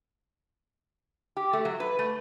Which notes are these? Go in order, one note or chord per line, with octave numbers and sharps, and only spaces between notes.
G4
A3
F#3
B4
A3